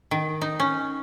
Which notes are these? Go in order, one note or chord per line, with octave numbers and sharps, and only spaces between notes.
D#3
D#4
C#4